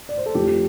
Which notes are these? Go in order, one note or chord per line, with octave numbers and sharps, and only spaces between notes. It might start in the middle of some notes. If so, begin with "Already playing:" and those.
D5
C5
A4
F2 F3 A3 G4